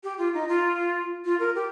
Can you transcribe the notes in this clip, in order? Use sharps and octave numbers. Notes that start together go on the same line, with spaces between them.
G4
F4
D#4
F4
F4
A#4
G4